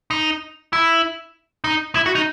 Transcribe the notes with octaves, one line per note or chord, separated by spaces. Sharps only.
D#4
E4
D#4
E4
F#4
D#4